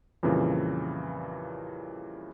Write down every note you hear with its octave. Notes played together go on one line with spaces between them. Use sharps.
F2 A#2 C#3 E3 G3